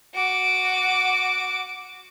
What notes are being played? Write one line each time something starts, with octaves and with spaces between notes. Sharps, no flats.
F#4 D6